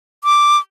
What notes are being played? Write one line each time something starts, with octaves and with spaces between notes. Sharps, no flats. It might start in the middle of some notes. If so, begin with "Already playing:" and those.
D6